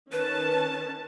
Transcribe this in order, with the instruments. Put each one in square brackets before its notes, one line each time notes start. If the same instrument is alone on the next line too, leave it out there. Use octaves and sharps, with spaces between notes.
[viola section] D#3 C#4 A5 [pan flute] B4